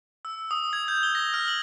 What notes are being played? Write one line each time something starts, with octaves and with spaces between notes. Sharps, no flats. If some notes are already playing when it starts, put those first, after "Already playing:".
E6
D#6
G#6
G6
G7
A#6
F6
F#7